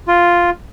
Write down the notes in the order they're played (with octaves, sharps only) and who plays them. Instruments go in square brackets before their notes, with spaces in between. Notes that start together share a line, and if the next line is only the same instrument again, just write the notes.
[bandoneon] F4